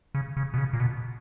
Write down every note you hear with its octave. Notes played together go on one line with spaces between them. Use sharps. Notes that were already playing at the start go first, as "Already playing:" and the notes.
C#3
C#3
B2
C#3
A#2
B2